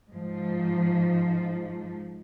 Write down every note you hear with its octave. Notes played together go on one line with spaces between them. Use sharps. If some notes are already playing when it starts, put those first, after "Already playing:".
G#2 F3